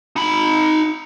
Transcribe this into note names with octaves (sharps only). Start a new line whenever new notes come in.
D#4 B5